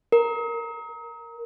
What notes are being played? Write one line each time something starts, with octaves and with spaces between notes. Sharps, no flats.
A#4